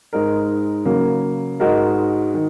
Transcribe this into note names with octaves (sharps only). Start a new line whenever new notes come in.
G#2 G#3 D#4 A#4
C#3 F#3 A#3
G#2 G#3 F#4 A#4
D#3